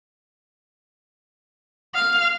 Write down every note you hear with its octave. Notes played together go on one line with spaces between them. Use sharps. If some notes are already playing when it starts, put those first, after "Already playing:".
F5